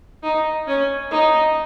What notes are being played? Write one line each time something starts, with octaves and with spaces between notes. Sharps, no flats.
D#4
C#4
D#4